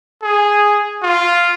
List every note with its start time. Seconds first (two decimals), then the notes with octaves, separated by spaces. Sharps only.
0.23 G#4
1.03 F4